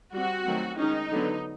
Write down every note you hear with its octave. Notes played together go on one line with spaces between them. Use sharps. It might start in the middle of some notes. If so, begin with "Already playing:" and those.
G3 C4 F#4
D#3 F#3 A3 C4
D#3 G#3 C#4 D#4
D3 F#3 B3